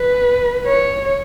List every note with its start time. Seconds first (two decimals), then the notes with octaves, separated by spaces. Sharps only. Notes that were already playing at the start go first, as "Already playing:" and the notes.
Already playing: B4
0.66 C#5